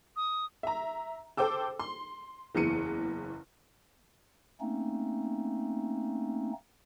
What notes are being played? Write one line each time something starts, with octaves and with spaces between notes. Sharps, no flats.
D#6
E5 A#5
A4 C5 G5 D6 E6
C6
F#1 E2 E3 C#7 D#7
A3 A#3 C4 C#4 D#4